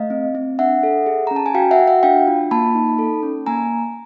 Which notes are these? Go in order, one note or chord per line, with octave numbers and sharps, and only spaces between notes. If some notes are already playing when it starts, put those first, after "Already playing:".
Already playing: A3 D#5 F5
C4
C4
D4 E5 F#5
A4
G#4
C#4 A#5
A5
G#5
F#4 F5 G5
E5 F#5
F#4
E5 F#5
D4 F5 G5
F4
A#3 A5 B5
D#4
A4
C#4
A#3 G#5 A#5